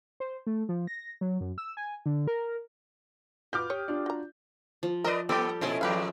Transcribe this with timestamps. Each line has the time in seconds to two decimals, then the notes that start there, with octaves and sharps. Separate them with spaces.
0.20 C5
0.47 A3
0.69 F3
0.87 A#6
1.21 F#3
1.41 F#2
1.58 E6
1.77 G#5
2.06 D3
2.27 A#4
3.53 F4 F#4 B4 D6 F6 G6
3.70 G4 C#5 G5 D#6
3.88 D4 F4 D5
4.06 F#4 A#5
4.83 F3
5.05 A#4 B4 D5 D#5
5.29 G3 A#3 B3 G4 A4
5.61 A#2 C#4 E4 A4 C5 D#5
5.81 E2 A2 F3 G4 B4 F5